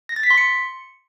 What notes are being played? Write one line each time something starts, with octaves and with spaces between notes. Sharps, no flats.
A#6
A6
B6
C6
C#7